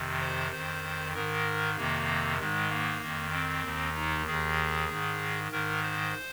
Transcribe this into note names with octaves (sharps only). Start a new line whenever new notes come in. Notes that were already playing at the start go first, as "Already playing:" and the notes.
Already playing: F2 C3 D#3
C5
F2 D#3 C5
G#2 D#3 A#4
F2 C3 D#3 A#3
G#2 D#3 G#3
A#3
F2 D#3
C4
D#2 D#3
D#4
D#2 D#3 G#4
G#2 D#3
G#2 D#3 A#4
C5